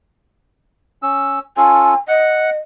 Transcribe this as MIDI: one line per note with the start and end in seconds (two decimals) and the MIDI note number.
1.03 1.39 61
1.03 1.39 88
1.57 1.94 61
1.57 1.94 65
1.57 1.94 69
1.57 1.98 80
2.08 2.57 75
2.08 2.50 78